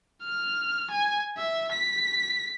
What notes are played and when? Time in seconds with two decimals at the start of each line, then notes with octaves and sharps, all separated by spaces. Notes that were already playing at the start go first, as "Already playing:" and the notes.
0.23 F6
0.90 G#5
1.37 E5
1.71 B6